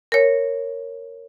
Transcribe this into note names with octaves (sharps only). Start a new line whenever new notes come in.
A#4 C#5